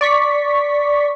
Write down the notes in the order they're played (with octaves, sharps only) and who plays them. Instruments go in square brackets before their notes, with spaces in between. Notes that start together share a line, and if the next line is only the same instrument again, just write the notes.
[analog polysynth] D5 C#6 B6